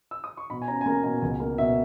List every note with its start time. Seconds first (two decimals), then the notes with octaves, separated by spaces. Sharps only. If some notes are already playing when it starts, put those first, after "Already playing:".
0.11 E6
0.24 D#6
0.37 C#6
0.50 B2 B5
0.62 G#5
0.68 C#4 A#5
0.81 G#5
0.86 A#3 A#5
1.03 B2 G#5
1.21 C#2 G#5
1.40 A#3
1.58 B2 E5